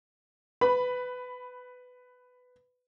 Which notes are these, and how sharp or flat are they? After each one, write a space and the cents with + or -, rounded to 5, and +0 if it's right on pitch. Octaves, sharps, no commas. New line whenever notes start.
B4 +15 B5 +0